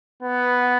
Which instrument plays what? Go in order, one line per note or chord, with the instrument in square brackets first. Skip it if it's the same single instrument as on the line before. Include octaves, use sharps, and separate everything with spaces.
[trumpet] B3